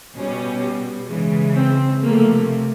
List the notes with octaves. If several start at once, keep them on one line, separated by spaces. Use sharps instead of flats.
B2 G3 C#4
C#3 E3 G#3
C4
C3 F3 A3 A#3